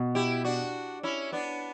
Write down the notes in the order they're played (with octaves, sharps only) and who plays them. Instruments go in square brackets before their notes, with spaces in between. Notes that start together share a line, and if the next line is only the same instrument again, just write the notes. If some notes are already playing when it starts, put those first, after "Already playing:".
Already playing: [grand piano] B2
[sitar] E4 G4
D4 F#4
C#4 E4
B3 D4